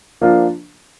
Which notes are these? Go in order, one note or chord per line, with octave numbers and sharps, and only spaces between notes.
F3 A#3 D4 F4